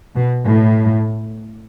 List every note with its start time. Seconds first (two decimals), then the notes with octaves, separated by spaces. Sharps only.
0.16 B2
0.45 A2